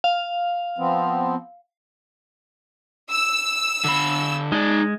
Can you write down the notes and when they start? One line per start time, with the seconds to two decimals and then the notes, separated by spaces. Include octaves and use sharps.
0.04 F5
0.78 F3 B3 C4
3.10 E6
3.84 D3 B5
4.52 G#3 D#4 D5